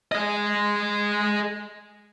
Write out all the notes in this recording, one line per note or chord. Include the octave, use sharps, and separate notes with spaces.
G#4 D#5